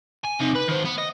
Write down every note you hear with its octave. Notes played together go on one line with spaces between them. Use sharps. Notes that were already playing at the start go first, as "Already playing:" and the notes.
G#5
C3 D#4
B4
D#3 C5
B3
D#5